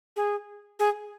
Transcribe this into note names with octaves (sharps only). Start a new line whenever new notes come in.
G#4
G#4